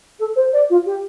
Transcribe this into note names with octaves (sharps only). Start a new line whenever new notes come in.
A4
C5
D5
F4
G4